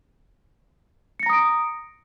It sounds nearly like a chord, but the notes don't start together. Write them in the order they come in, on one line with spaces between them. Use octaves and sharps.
C#7 A#6 A#5 D#6 D7